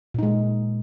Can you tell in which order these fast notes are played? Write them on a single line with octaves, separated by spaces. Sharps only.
A#2 D#4 G#3